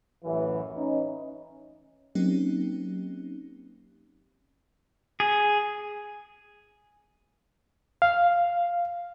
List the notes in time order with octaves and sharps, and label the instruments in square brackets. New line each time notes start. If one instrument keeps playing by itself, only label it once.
[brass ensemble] A1 F#2 E3
C#4 D#4
[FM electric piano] F#3 A#3 C4 C#4 D#4 G4
[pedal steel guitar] G#4
[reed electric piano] F5